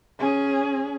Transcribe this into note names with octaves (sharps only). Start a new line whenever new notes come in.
C#4 G#4